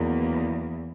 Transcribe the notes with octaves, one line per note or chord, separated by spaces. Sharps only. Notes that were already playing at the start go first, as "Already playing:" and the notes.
Already playing: E2 D#3 F#3 A#3